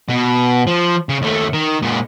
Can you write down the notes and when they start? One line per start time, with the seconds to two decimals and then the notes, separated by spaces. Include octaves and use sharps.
0.09 B2
0.67 F3
1.09 C#3
1.22 D#2 A3
1.53 D#3
1.83 A#2 G#3